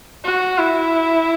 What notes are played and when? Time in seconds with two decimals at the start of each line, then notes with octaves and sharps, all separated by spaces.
0.25 F#4
0.58 E4